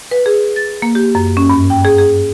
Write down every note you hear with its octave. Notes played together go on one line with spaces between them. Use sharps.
B4
G#4
A6
A#3
G4
F#2
C#4
G2
G5
G#4
G#4